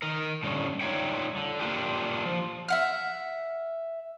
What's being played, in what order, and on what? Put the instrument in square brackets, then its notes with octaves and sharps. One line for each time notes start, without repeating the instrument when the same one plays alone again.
[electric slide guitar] D#3 A#4
A2 D3 G3 C#4
G3 D#4 F4 C#5 E5 G5
D3
A#3 D4 F4 G4
F3
[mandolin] E5 F#5 F6